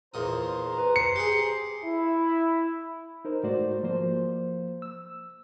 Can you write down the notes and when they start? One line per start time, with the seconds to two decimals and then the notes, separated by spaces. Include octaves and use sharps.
0.14 E2 A#2 C5 A#5 D#6
0.78 B4
0.96 C7 C#7
1.16 G4 G#4
1.85 E4
3.25 D#4 A#4 C5
3.43 G#2 A3 F#4 C5 D5
3.83 F3 A#3 C5
4.82 E6